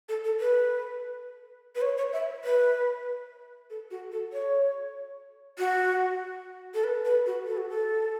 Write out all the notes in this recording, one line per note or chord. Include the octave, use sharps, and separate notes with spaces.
A4
A4
B4
B4
C#5
C#5
E5
B4
A4
F#4
A4
C#5
F#4
A4
B4
B4
F#4
A4
F#4
A4